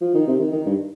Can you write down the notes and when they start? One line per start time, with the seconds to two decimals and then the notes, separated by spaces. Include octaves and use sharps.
0.01 F3
0.14 D#3
0.27 C3
0.40 D#3
0.53 D#3
0.66 G2